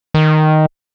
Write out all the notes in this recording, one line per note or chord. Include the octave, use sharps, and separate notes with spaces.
D#3